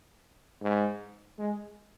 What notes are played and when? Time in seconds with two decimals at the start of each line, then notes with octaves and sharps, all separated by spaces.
0.62 G#2
1.39 G#3